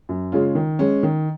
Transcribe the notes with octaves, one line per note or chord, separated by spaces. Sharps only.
F#2
C#3 G#3 C#4 F4
D#3
G#3 C#4
D#3